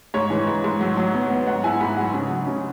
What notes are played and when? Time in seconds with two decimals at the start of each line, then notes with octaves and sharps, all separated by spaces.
0.14 G#2 C#5
0.30 E3
0.47 G#2
0.64 G#2
0.81 F#3
0.97 F#3
1.14 B3
1.30 B3
1.47 G#2 F#5
1.64 E4 G#5
1.80 G#2 B5
1.97 F#3 F#5
2.14 C#3
2.30 F#3
2.47 C#3